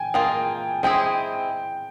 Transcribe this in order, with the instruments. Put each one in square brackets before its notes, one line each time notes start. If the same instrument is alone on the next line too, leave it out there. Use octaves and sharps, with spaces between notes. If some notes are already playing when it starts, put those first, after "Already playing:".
Already playing: [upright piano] G5 G#5
[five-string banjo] A#3 F4 G#4 [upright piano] G5
[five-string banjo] G#3 C4 E4 G#4 [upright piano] G5